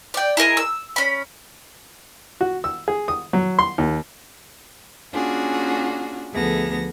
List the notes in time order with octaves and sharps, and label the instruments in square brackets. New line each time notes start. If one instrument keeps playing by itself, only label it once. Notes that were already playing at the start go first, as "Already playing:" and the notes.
[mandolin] D5 G5
E4 G#4 A#4 D#5
E6
C#4 B5
[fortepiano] F#4
E6
G#4
D#6
F#3
C6
D#2
[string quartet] A#3 C#4 D4 F4 F#4 G#4
D2 F3 B3 G#4 A4 A#6